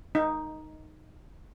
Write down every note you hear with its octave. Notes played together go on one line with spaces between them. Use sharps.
D#4